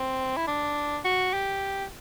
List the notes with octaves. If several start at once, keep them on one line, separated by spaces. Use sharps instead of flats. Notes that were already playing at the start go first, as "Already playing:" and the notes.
Already playing: C4
E4
D4
F#4
G4